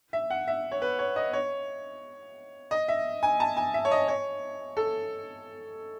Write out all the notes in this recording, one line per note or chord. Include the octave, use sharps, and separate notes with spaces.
E5
F#5
E5
C#5
B4
C#5
D#5
C#5
D#5
E5
G#5
A5
G#5
E5
C#5
D#5
C#5
A4